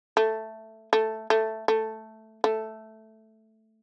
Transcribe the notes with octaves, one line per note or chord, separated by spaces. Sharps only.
A3
A3
A3
A3
A3